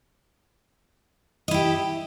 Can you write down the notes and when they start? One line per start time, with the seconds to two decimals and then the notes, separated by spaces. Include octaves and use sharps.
1.48 D#5
1.51 E4
1.54 G4